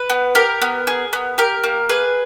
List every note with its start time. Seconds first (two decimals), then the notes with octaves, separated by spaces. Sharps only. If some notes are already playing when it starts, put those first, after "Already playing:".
Already playing: B4
0.10 B3
0.35 G4 A#4
0.61 B3
0.87 G#4
1.13 B3
1.38 G4 A#4
1.64 A#3
1.89 G#4 B4